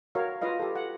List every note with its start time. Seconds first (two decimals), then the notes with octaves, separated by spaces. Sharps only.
0.15 F#4 A#4 C#5 F5
0.41 F4 B4 D#5 F5
0.60 G4 A4
0.76 F#5